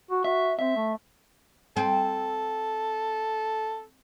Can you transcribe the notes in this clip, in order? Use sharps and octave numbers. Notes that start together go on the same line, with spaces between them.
F#4
F#4 E5
C4 E5
A3
C4 A4